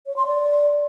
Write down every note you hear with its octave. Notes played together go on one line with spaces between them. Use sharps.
C#5
C6
D5